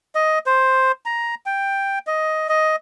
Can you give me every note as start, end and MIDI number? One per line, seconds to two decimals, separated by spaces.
0.15 0.39 75
0.46 0.92 72
1.06 1.35 82
1.46 1.99 79
2.07 2.47 75
2.49 2.76 75